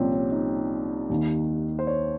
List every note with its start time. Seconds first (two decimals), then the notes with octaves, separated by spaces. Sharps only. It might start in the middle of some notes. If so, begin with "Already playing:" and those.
Already playing: C2 A#2 F3 C4 C#4 G4
0.13 C#4
0.32 D#4
1.10 D#2 D#3
1.79 C5
1.87 C#5